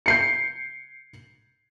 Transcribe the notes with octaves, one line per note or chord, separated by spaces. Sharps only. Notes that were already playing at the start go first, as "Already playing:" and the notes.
G6 C7 C#7